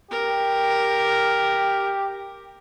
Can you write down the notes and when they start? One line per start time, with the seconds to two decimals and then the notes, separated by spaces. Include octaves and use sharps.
0.11 G4 A#4